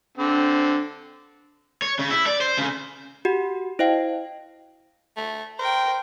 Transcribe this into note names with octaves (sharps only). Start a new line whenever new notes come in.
D3 C4
C#5
C#3
E4
D5
C5
C#3
F#4 G4 F#5
E4 C5 D#5 F5 G5
A3
A#4 C5 G5